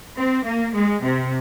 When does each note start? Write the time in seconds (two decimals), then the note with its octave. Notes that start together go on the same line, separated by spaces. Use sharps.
0.16 C4
0.44 A#3
0.74 G#3
1.02 C3